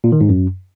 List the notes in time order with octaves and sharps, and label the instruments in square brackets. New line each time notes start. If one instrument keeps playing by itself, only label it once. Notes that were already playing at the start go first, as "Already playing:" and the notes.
[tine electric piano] A#2
D#3
G#2
F#2